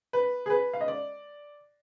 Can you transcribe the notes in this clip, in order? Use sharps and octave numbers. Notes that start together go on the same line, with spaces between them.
B4
G#4
B4
F5
D#5
D5